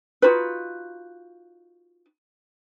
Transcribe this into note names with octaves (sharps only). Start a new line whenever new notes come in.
D#4 F4 F#4 B4